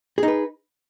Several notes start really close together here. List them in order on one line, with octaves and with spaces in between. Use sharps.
G#4 D#4 B4